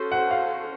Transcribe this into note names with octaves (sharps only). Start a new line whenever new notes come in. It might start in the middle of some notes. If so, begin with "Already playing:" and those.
Already playing: C#4 F#4 A4 C5
F#5
F5